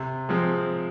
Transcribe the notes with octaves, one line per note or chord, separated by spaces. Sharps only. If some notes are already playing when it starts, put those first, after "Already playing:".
Already playing: C3
F3 G#3 C4